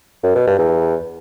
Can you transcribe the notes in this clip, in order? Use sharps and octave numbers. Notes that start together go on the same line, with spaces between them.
F#2
B2
G2
E2